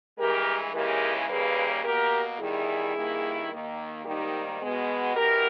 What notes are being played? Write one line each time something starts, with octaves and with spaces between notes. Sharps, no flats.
G2 E3 G#3 G4 A#4
D#2 C#3 E3 G#3 G4 A#4
D#2 C#3 G3 A#3 G#4 B4
B2 A#3 G4 A#4
E2 D#3 G3 E4 G#4
G2 D#3 A#3
D#2 D#3 A#3
G#2 D#3 G3 A#3 D#4 G4
B2 G#3 B3
E2 B2 G4 A#4